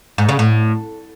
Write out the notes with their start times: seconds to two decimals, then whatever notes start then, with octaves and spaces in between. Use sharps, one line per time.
0.18 G#2
0.29 C#3
0.39 A2